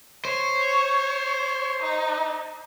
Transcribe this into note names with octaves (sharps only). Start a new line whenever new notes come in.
C5 C#5
D#4